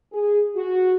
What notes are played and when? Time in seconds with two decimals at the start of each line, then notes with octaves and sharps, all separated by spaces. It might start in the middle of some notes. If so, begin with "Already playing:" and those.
0.12 G#4
0.56 F#4